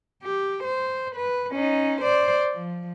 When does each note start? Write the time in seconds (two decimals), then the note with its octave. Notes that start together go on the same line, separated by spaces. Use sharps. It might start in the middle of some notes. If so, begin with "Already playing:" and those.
0.23 G4
0.64 C5
1.16 B4
1.52 C#4 D#4
2.02 C5 D5
2.54 F3